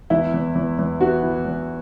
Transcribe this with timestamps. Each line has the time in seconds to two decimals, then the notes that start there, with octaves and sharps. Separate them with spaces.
0.10 E2 E4
0.34 E2
0.55 E2
0.79 E2
1.01 B3 F#4
1.23 E3
1.45 E2